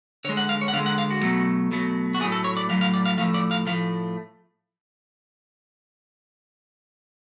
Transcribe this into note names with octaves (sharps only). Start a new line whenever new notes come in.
D3 G#3 C#5
F#5
F5
C#5
F#5
D3 G#3 F5
F#5
F5
F#4
B2 F#3 A3
B2 F#3 A3
F#4
A2 F#3 A3 G#4
A4
C#5
D5
A2 F#3 A3 F5
F5
D5
F5
A2 F3 A3 F5
D5
F5
A2 F3 A3 F5